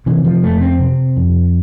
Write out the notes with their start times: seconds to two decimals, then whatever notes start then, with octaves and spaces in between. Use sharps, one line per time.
0.06 C3 E3
0.24 F3
0.43 F2 A3
0.61 C4
0.79 C3
1.17 F2